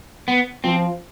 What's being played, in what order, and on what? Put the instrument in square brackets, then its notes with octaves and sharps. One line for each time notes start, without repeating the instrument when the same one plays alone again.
[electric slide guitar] B3
[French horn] F3 [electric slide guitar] C4